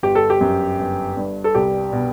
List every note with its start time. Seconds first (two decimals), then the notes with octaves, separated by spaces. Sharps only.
0.03 G1 G4
0.15 A4
0.30 G4
0.41 F#2
0.79 G1
1.17 G2
1.44 A4
1.55 C2 G4
1.92 B2